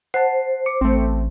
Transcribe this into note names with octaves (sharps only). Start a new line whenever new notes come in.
C5 F#5 A5
D6 C#7
A1 A3 C4